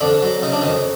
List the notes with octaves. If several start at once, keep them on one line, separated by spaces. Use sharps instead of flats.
F2 D3 D4
F#3
C#3 D#4
D4
F2 D#3 D#4